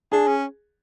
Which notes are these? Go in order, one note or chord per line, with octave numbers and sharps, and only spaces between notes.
D4 G#4
C#4